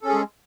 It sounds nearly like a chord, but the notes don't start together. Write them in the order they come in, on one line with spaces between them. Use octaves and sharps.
A4 C#4 G#4 G#3